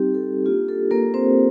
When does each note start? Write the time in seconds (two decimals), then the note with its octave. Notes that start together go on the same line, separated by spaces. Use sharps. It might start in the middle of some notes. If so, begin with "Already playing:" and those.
Already playing: G3 C4 D#4 G4
0.14 A4
0.46 A#3 D4 F4 G4
0.69 A4
0.91 A#3 A#4
1.14 C4 C5